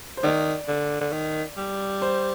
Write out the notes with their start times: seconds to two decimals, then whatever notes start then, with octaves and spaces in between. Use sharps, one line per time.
0.17 C5
0.23 D#3 D5
0.68 D3
1.01 D3
1.13 D#3
1.57 G3
2.02 C5